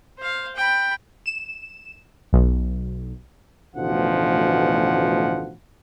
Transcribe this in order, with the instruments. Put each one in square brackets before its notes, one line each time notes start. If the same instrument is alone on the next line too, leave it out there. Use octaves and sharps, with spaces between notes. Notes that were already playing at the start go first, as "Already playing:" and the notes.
[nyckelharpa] C5 F5
G5 B5
[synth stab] E7
B1
[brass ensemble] A1 D2 B2 F3 F#5